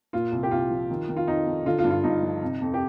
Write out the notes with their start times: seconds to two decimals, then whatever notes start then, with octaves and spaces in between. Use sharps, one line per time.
0.13 A#2 F4
0.32 C2
0.43 G4
0.51 C2 F4
0.71 F3
0.90 D#3
1.09 D#3
1.16 F4
1.27 F2 D#4
1.46 F2
1.66 D3 F4
1.78 F4
1.84 G2
1.90 F4
2.03 G2 D#4
2.22 F3
2.42 C3
2.61 F2
2.74 G4